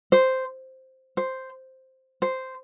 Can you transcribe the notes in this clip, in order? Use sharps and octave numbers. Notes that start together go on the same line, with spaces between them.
C5
C5
C5